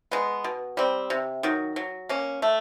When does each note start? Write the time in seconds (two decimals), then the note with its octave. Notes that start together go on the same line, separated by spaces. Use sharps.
0.11 G#3 B3
0.44 B2
0.77 G3 C4
1.10 C3
1.43 D#3 F#3
1.76 F#3
2.09 A#3 C#4
2.42 A3